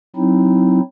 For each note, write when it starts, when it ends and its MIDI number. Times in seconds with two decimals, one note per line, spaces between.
0.16 0.80 54
0.16 0.80 60
0.16 0.80 63
0.16 0.80 64